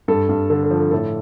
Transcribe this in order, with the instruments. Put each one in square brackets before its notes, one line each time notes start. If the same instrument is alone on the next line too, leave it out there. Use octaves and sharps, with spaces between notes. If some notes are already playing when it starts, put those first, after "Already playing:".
[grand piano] G2 A4
G2
D3 A4
A4
F3
A4
A2 A4